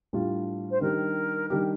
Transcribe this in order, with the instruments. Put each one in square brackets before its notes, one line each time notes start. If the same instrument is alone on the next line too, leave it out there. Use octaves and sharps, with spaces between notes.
[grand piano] A2 G3 D4 F4
[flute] C5
[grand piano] D#3 G3 D4 G4 [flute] A#4
[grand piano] D#3 G3 D4 G4 [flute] A#4